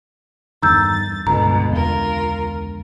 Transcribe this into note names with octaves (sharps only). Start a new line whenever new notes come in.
E2 G2 D#3 A#5 E6 G6 A6
C#2 G2 B2 D3 A#5
E2 F4 A#4